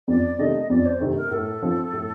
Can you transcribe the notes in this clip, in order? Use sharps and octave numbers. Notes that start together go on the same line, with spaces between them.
F2 D5
C3 D#3 A3 C4 D#5
F2 D5
C5
C3 D#3 A3 C4
A#4
A2 A4
F3 C4
A2